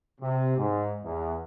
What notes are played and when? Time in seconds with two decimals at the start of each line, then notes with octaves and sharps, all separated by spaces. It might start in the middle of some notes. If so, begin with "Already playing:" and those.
0.21 C3
0.57 G#2
1.03 E2